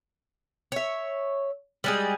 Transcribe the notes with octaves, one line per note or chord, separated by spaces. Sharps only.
C#5 E5
G3 G#3 G#4